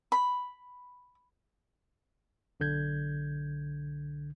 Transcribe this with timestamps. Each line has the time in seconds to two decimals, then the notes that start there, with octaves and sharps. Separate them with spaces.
0.12 B5
2.60 B1 D3 G6 G#6